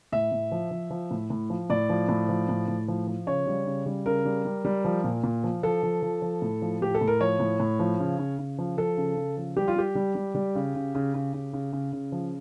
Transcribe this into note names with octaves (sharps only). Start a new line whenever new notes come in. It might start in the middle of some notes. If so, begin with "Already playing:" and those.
A2 E5
A2
F3
F3
F3
A2
A2
F3
A2 D5
F3
A2
F3
A2
A2
F3
F3
C#3 C#5
G3
C#3
G3
C#3 A#4
G3
G3
G3
F3
A#2
A#2
F3
F3 A4
F3
F3
F3
A2
F3
A2 G4
A4
A2
A#4
F3 C#5
A2
A2
F3
C#3
C#3
C#3
F3
F3 A4
C#3
C#3
F3
G3 G4
F4
G3 G4
G3
G3
G3
C#3
C#3
C#3
C#3
C#3
C#3
C#3
C#3
F3